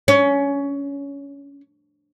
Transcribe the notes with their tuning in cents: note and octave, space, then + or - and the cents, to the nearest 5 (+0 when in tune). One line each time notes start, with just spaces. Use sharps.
C#4 +20